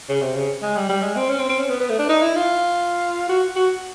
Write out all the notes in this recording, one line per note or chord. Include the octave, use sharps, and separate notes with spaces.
C#3
C3
C#3
G#3
G3
G3
G#3
C4
C#4
C4
C4
C#4
B3
B3
A3
D4
D#4
E4
F4
F#4
F#4